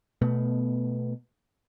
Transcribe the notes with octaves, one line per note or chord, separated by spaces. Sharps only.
B2 A3 B3